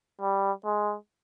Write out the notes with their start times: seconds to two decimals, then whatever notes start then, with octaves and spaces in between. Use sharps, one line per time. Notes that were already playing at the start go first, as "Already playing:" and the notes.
0.21 G3
0.65 G#3